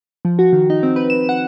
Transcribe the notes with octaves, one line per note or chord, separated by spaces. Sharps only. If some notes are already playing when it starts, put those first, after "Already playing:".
F3
F#4
D#3
D#4
C4
B4
E7
F#5